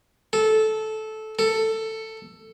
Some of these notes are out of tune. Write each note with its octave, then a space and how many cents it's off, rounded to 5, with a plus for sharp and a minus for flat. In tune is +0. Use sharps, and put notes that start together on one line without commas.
A4 -15
A4 +10